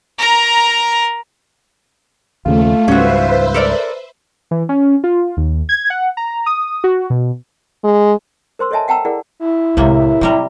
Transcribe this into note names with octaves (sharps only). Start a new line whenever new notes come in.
A#4 A#5
D#2 C#3 F3 A3 F4
C#2 G#2 G3 C#4 F#4 B4 C5 E5
A4 A#4 D5
E3
C#4
F4
D#2
G#6
F#5
A#5
D#6
F#4
B2
G#3
A#4 C5 C6 E6
A4 C#5 D#5 E5 G#5 A5
F#5 G5 A5 A#5 E6
E4 G#4 A#4 D5 F#5
E4
C2 A2 C3 G#3 A#3
C3 F#3 G3 A#4